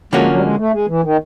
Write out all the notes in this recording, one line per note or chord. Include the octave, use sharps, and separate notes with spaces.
D3 F3 G#3 A#3 C#4 F#4
F#3
G3
G#3
A3
G#3
E3
D#3